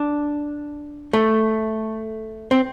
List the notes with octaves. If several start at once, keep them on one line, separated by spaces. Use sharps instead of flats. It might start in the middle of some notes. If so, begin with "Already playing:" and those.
Already playing: D4
A3
C4